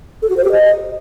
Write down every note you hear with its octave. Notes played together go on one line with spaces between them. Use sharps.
A4
F#4
C5
G4
D#5